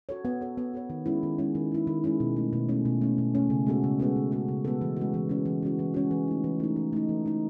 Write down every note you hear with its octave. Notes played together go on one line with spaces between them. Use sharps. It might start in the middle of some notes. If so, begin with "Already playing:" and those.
F#4 A4 C#5
B3
F#4 A4 C#5
B3
F#4 A4 C#5
D#3
G#3 C#4 E4
D#3
G#3 C#4 E4
D#3
G#3 C#4 E4
D#3
G#3 C#4 E4
B2
A3 C#4
B2
A3 C#4
B2
A3 C#4
B2
A3 C#4
C#3
G#3 B3 F#4 A4
C#3
G#3 B3 F#4 A4
C#3
G#3 B3 F#4 A4
C#3
G#3 B3 F#4 A4
E3
G#3 C#4 F#4
E3
G#3 C#4 F#4
E3
G#3 C#4 F#4
E3
G#3 C#4 F#4
E3
A3 D#4
E3
A3 D#4
E3
A3 D#4
E3
A3 D#4